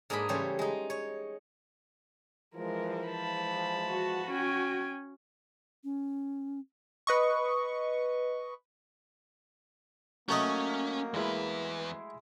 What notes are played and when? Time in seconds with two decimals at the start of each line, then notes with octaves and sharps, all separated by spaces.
0.10 G#2 A#3 D4 G#4 B5
0.29 C#3 E3 G3 A3 C5 C#5
0.59 G#3 D#4
0.90 C#5
2.55 E3 F3 G#3 A#4
3.07 G#3 A5 B5
3.89 F#4
4.31 C#4 G5 G#5
5.84 C#4
7.07 B4 D#5 C#6
10.29 F#3 A3 A#3 C#4 D#5
11.14 E2 G#3 E4 B4